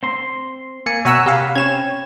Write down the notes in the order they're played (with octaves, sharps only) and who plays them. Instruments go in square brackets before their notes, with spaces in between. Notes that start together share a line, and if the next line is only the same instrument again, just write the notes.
[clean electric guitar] C4 C6
[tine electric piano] A#3 G#5 C#7
[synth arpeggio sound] B2 F#5 E6 [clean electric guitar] C#5 [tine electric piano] E5 G#5 A#5
[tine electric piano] C3 [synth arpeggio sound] G4 F5 [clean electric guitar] A#5 B5
[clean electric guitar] C4 [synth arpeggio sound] C#4 E7 [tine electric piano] C#5 G#6